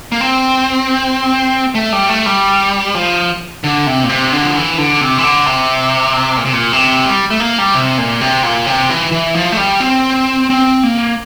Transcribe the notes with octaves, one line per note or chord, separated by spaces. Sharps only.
A#3
C4
A3
G3
A3
G3
F3
D3
C3
A#2
C3
D3
F3
E3
D3
C3
E3
D3
C3
A#2
C3
A#2
C3
G3
A3
A#3
G3
C3
A#2
C3
A#2
C3
E3
E3
F3
A3
G3
C4
C4
A#3